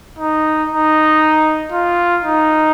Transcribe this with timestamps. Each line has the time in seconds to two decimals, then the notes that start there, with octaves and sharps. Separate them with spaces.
0.19 D#4
0.70 D#4
1.72 F4
2.23 D#4